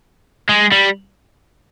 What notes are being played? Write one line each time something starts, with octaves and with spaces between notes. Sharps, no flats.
G#3
G3